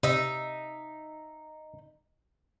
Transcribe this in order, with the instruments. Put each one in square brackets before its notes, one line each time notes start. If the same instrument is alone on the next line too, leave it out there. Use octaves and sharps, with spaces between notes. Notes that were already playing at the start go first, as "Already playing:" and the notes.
[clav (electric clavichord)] C3 [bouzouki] D#4 E5